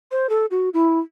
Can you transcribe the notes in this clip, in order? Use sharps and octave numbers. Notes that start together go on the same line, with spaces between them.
C5
A4
F#4
E4